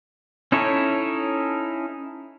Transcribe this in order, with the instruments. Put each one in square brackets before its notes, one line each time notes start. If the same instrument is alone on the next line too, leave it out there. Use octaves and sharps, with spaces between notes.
[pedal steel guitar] C#4 D#4 E4 A4 C#5